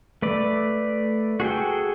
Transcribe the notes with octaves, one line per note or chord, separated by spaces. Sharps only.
A3 B4 D5
F#4 G#4 A4 G5